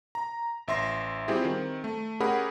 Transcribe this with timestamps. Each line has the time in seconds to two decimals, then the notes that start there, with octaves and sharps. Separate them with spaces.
0.15 A#5
0.68 A1 E5 C6 A#6
1.28 G3 C4 E4 F4 G4 G#4
1.45 D#3 C4
1.84 A3
2.20 C#4 G4 G#4 A#4 F#5 B5